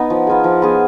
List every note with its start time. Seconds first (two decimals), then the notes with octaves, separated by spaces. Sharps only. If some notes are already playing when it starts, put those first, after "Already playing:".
Already playing: B3 D#4
0.10 F3
0.27 B3 F4 G#4
0.44 F3
0.62 B3 F4 G#4